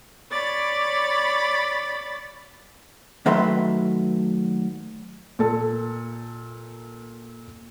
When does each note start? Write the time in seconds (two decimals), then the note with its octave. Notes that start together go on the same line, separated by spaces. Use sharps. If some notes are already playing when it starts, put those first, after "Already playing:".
0.31 C#5 D5 B5 A6
3.26 D#3 F#3 A3 B4 E5 C6
5.39 A#2 A4 A5